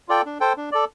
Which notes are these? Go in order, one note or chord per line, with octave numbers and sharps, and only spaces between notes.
F4 A4 D5 G5
D4
A4 C5 G5
D4
A4 D5